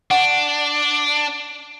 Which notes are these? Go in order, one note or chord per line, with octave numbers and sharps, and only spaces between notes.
D4 F#5 C#6